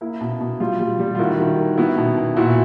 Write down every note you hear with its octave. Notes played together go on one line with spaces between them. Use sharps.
A#3 E4
B2
B2
G3 F4
G3
G3
F4
D#3 E4 F#4
D#3
D#3
B3 E4 F#4
B2
B2
A#2 E4 F#4